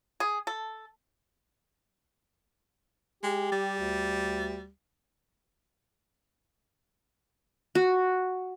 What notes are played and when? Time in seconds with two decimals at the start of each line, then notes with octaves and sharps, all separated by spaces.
0.20 G#4
0.47 A4
3.23 G#3 G4
3.52 G3
3.79 D2
7.75 F#4